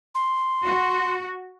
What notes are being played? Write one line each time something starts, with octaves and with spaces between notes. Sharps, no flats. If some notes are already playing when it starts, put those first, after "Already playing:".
C6
F#4